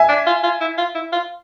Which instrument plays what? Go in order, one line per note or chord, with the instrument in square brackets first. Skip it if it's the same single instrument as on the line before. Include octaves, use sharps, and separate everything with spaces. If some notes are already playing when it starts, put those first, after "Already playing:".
Already playing: [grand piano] E5 G#5
[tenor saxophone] D4
F4
F4
E4
F4
E4
F4